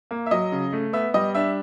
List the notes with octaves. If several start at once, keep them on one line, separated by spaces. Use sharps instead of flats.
A#3
E5
F#3 D#5
C#3
A3
B3 E5
G3 D#5
D4 E5